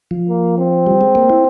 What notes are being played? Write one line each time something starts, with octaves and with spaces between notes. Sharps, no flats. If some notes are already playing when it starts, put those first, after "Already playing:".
F3
A#3
C4
G3
G#3
A#3
E4